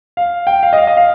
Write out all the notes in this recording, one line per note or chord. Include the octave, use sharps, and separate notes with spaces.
F5
G5
F5
D#5
F5
D#5
F5